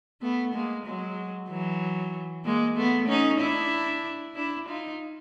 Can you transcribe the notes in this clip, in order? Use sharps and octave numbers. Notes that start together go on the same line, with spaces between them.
A3 B3
G#3 A#3
F#3 G#3
E3 F#3
G#3 A#3
A3 B3
C#4 D#4
D4 E4
D4 E4
D#4 F4